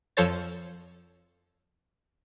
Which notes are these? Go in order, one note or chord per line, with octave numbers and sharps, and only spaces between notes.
F2 F3 A4 C5 C#5 A6